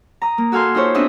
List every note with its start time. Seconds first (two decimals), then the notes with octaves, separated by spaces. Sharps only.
0.22 A#5 D#6
0.38 A#3
0.52 F#4 A4 F5 G#5 C6
0.75 D#4 F4 G#4 C5 C#5 E5
0.94 B3 C4 D4 G#4 D#5 E5